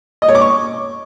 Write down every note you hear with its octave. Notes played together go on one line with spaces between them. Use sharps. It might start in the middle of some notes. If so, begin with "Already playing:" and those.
D#5
C#5
D6
C#6